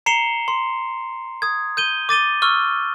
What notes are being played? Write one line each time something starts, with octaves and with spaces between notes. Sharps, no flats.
A#5 C7 C#7 E7 F7 G7
C6
D#6 G#6
G6 D#7 G7
D6 A6 D#7 G7
C#6 E6 F6 G7